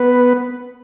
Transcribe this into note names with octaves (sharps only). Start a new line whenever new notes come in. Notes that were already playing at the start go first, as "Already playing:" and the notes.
Already playing: B3 B4